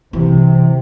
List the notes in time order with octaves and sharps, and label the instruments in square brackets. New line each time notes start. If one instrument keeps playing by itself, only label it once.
[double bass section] C3 [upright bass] E3